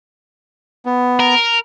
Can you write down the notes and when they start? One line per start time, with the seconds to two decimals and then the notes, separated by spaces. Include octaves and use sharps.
0.85 B3
1.20 A#4